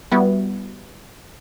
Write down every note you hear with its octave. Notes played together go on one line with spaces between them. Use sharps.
G3 B3 E4 F#4